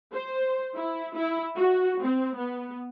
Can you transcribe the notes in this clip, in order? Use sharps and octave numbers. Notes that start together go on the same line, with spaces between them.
C5
E4
E4
F#4
C4
B3